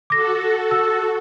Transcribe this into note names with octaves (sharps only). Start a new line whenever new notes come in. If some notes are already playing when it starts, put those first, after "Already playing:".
F#4 A4 D6 A#6
E6